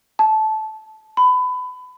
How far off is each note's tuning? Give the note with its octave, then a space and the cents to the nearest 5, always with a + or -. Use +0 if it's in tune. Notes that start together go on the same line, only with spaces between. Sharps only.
A5 -15
B5 +25